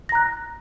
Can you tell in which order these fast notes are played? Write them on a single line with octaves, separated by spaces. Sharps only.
A#6 A#5 F#6